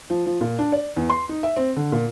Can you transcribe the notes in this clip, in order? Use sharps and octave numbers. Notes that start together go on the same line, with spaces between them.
F3
F3
A#2
D4
D5
E2
C6
D#4
E5
C4
D3
A#2